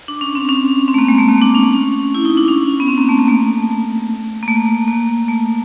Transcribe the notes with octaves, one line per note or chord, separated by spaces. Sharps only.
D4
C#4
C4
C#4
C4
A3
A#3
G#3
A3
A#3
D4
C#4
E4
D#4
D4
C#4
B3
C4
A#3
A3
A#3
A3
A#3
A3
A#3
A3